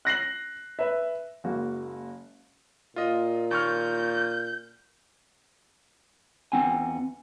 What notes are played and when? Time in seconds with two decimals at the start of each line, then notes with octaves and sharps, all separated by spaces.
0.05 F#6 A#6 C7 F#7
0.79 B4 E5
1.44 F#1 G#3 A#3 F#4
2.96 A#2 F4 D#5
3.51 D#2 C#6 F6 G6
6.52 E2 C4 F#5 G#5